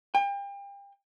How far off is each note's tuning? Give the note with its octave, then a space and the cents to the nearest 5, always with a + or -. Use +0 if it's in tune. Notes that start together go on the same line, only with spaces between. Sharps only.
G5 +35